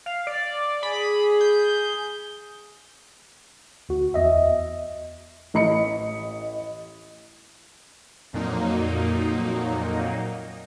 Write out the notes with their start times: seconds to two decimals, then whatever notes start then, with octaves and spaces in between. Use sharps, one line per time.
0.06 F5
0.27 D5
0.83 G#4 B5
1.41 G6
3.89 D2 F#4
4.14 E2 D#5 E5
5.54 A1 D#5 B5 C#7
8.33 F2 A#2 F#3 A#3 D#4